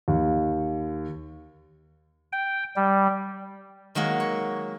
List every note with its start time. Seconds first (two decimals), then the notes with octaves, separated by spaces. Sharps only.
0.08 D#2
2.32 G5
2.76 G3
3.95 D#3 F#3 G#3 A#3
4.20 C#5